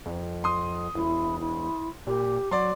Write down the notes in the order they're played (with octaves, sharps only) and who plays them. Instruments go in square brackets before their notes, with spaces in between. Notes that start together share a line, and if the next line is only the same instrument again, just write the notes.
[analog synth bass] F2
[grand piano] C6 D#6
[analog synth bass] E1 [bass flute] E4
[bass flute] E4
[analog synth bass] A#2 [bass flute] G4
[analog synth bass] F#3 [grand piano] D5 C6